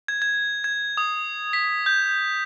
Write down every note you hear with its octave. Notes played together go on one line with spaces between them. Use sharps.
G#6
G#6
G#6
D#6
B6
G6